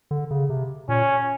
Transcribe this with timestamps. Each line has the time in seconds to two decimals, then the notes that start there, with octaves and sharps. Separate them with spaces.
0.11 D3
0.31 C#3
0.50 C3
0.89 A#2 C#4